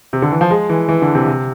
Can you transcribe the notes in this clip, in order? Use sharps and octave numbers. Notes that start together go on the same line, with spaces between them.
C3
D3
E3
F3
G#3
E3
E3
D3
C3
C3